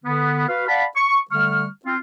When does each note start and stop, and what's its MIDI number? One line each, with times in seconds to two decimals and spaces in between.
0.04 0.44 50
0.04 0.44 59
0.47 0.67 66
0.47 0.67 71
0.47 0.67 77
0.67 0.85 74
0.67 0.85 77
0.67 0.85 78
0.67 0.85 81
0.67 0.85 83
0.95 1.18 85
1.31 1.66 50
1.31 1.66 55
1.31 1.66 57
1.31 1.66 85
1.31 1.66 89
1.85 1.96 60
1.85 1.96 65